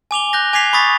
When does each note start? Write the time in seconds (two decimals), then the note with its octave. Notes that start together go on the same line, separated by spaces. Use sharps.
0.11 G#5 D6 F7 G7
0.33 F#6 G6 A#6
0.53 G#5 D6 G#6 B6 C7 F7
0.73 B5 C#6 D#6 A6 B6